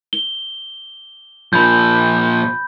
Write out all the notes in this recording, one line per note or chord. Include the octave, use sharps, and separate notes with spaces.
G7
A#2 F3 B5 G6